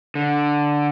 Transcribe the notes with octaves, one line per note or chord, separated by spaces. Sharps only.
D3